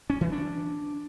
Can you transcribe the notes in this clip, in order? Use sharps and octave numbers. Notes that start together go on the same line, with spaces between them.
C#4
E3
D4